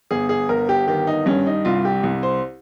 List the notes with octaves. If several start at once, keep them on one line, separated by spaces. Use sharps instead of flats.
G1 G#4
G#4
G1 A#4
G4
D#3 G4
D#4
G2 C#4
D#4
C2 F4
G4
C2
C5